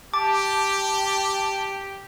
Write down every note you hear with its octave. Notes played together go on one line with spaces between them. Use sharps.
G4 A5 D6